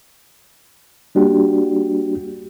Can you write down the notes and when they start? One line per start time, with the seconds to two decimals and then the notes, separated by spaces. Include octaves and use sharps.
1.15 G3 A#3 D4 F#4 G4